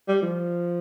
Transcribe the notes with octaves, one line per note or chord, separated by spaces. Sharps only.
G3
F3